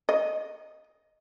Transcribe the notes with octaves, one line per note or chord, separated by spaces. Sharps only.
D#5